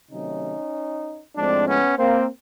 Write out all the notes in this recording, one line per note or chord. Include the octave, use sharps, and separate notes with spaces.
C3 D#3 F#3 A3 C#4 D#4
A2 F3 G#3 C4 D4
B3 C#4
A#3 C4